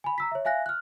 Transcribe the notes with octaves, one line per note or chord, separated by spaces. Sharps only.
G#5 B5
A#5 E6 B6
C#5 E5
E5 F5 G#5 F#6 A#6
F6 F#6